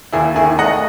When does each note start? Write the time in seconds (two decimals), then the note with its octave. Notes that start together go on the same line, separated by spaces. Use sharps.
0.12 D#2 E4 G#4
0.36 D#3 E4 G#4
0.59 A3 D#5 F#5